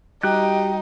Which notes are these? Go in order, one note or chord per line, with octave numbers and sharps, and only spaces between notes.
G3 D#4 F#4 G4 G5 F#6 G6